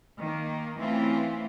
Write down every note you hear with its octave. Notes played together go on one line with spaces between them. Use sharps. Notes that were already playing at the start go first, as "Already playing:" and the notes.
D#3 A#3
E3 A3 C4 C#4 E4 F4